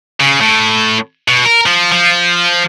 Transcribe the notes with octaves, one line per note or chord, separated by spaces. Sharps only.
C#3
A2
B2
A#4
F3
F3